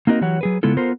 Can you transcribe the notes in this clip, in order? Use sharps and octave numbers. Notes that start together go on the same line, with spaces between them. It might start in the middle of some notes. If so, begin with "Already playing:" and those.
A#3 C4 D#4 F#4 A#4 D#5
E3 F#3 G4 C#5 F#5
F#3 G#4 B4
C#3 G#3 B3 E4 F4 A4
B3 F4 A4 A#4 C5